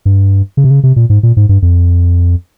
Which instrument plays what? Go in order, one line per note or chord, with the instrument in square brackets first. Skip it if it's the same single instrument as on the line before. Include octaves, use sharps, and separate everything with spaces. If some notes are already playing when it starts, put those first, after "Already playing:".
[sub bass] G2
C#3
C3
C#3
C3
A#2
G#2
A#2
G#2
G2
F2